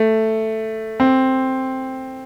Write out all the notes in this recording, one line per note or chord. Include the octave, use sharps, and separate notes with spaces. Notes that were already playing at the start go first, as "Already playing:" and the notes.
Already playing: A3
C4